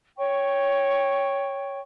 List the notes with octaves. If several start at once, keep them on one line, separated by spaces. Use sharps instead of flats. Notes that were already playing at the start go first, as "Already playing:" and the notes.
C#5 G5 C#6